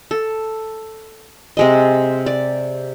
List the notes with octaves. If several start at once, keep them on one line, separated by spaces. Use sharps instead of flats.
A4
C3 G#3 D#5
D5